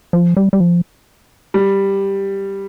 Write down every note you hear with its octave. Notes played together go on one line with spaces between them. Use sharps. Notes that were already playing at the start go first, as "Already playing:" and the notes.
F3
G3
G3
F3
G3